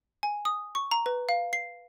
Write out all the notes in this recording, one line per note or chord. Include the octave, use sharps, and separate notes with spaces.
G#5
D#6
C#6
A#5
B4
F5
C7